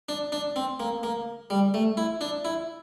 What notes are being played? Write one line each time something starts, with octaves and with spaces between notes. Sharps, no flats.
D4
D4
C4
A#3
A#3
G3
A3
E4
D4
E4